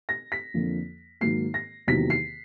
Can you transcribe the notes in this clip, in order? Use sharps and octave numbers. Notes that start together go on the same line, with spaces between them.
A#6
B6
F2 D3 F3 A#3
G#2 D#3 F#3 A#3 C7
A#6
E2 C3 D#3 F#3 A#3 B6
C7